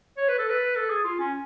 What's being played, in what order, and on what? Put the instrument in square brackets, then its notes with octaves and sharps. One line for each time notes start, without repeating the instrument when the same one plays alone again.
[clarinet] C#5
B4
A4
B4
A4
G#4
F4
C#4